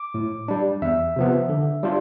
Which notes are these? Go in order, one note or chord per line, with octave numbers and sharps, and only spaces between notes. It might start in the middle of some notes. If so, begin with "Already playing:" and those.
Already playing: D6
A2
G3 D4
E2 E5
C3 F3 B3
D3
G3 D4 F4